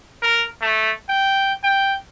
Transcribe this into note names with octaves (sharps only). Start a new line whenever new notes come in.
A#4
A3
G5
G5